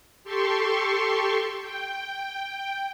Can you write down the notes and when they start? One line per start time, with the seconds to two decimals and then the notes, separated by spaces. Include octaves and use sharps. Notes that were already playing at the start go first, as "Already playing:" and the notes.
0.24 G4 A4 C6 C#6
1.58 G5